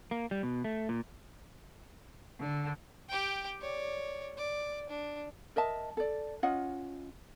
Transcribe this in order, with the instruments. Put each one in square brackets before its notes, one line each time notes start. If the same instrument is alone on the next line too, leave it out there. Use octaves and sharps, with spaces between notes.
[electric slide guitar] A#3
G3
B2
A3
A#2
[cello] D3
[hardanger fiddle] G4 G5
C#5 D5
D5
D4
[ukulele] A#4 D#5 E5 A5
A4 D5
C#4 F4 D#5 F#5